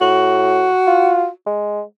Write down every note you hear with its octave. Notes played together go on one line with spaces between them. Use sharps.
A2 F#4
F4
G#3